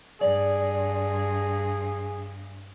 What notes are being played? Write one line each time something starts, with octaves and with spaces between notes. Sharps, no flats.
G2 G#4 D5